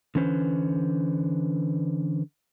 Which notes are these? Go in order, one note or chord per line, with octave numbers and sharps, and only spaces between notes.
D3 E3 C#4 B4 C5